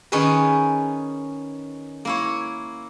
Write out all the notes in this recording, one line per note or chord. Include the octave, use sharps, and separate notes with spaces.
D#3 C#4 D#4 G#4 B4
A#3 E4 C#5